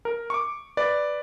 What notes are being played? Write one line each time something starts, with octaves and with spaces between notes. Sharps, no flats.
A#4
C#6 D6
B4 D5